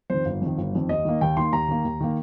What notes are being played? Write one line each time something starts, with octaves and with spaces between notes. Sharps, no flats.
F2 D#3 C5
G1
F2 D#3
G1
F2 D#3
D#2 D#5
D#3 A#3
D#2 G5
D#3 A#3 C6
D#2 A#5
D#3 A#3
D#2
D#3 A#3